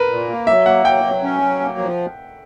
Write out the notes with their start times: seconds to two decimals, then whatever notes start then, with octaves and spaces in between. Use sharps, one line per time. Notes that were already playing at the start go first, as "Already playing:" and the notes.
Already playing: A#4 B4
0.09 A#2
0.29 A#3
0.47 F#3 E5
0.66 A#3 F#5
0.85 F#3 G5
1.04 F#3
1.23 C#4
1.42 F#3
1.60 A#3
1.79 F3